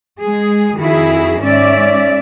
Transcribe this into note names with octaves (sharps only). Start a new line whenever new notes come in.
G#3 G#4
F2 D#3 E4 F#4 G#4
G#2 C#4 D5 E5